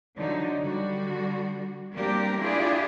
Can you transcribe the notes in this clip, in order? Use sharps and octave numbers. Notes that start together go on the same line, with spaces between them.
D3 F3 F#3 D#4
D3 G3 F#4
G3 A#3 C4 D4 G4 A#4
D4 E4 F4 G4 G#4 D5